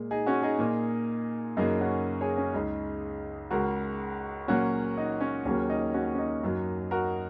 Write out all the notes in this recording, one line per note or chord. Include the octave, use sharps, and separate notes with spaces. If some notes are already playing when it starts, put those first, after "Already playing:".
Already playing: A#2 G#3 A#4
D#4 G#4
C#4 F#4
D#4 G#4
A#2 A#3
F#2 C#3 F#3 A#3 D#4
C#4 F#4
G#4 C#5
C#4
C#2 C#3 G#3 D#4
C#2 C#3 G#3 F#4 A#4
A#2 F#3 A#3 C#4 F#4
D#4
C#4
D#2 C#3 F#3 A#3 C#4
D#4
C#4 F#4
C#4
D#4
F#2 F#3 A#3
F#4 A#4